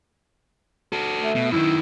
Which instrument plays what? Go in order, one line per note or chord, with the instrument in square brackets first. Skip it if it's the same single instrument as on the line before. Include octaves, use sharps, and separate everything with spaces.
[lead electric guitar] F#4 A4
[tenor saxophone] A3
[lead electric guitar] B2
[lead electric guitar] F#2 D#3 [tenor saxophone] E4